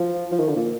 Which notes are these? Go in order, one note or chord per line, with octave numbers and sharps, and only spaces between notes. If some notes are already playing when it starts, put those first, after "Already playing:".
Already playing: F3
F3
D#3
D3
A#2